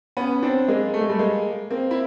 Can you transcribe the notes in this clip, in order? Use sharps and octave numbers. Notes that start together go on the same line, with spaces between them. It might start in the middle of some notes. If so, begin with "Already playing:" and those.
B3 C#4
C4 D4
G#3 A#3
A3
G#3
G3 A3
G#3 A#3
A#3 C4
E4